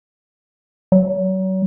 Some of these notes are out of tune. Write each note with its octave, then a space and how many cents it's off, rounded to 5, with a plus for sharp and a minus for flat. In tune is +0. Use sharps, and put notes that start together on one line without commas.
F#3 +35